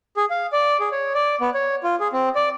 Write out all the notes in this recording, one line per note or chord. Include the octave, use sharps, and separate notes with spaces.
G#4
F5
D5
G#4
C#5
D5
B3
C#5
F4
G#4
C4
D5